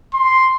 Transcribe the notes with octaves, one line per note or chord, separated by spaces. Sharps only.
C6